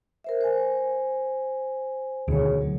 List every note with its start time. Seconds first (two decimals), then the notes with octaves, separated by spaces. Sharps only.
0.24 A#4 C5 E5
0.41 C5 G#5
2.28 D2 B2 D#3 G#4 C#5
2.61 F#3